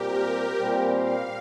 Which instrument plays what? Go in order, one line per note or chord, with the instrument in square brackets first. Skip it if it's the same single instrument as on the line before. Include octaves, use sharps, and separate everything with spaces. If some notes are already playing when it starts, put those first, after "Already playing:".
Already playing: [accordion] A#2 G3 C4 [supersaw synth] G4 A#4
[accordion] A#2 G3 C4
[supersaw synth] F5